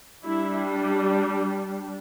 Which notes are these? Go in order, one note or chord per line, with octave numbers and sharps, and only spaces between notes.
G3 D4 E4